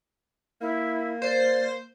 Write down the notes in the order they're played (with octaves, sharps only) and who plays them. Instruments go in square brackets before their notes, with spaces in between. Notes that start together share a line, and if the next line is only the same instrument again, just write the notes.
[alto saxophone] A#3 [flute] E4
[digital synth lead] C5 [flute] D5